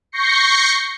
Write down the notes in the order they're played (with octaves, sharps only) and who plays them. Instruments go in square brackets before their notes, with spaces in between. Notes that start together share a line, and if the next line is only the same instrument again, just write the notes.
[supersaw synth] C#6 G6 A#6 C7 C#7